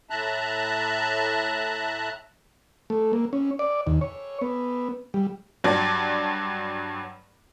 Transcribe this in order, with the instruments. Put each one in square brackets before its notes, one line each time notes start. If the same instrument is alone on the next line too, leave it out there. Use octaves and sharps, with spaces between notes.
[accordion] A2 E5 A5 A#5 F#6
[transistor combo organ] A3
A#3
C#4
D5
D#2
C#5
B3
G3
[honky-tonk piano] G2 F#3 D5 A5